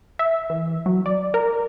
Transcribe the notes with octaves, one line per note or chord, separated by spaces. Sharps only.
E5
E3
F#3
D5
A#4